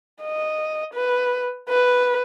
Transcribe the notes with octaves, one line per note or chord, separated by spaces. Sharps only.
D#5
B4
B4